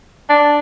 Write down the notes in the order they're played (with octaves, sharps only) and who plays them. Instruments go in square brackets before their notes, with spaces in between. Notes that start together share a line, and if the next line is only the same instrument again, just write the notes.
[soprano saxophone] D4